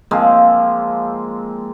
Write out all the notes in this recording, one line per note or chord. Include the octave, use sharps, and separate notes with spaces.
F3 G#3 A#3 C4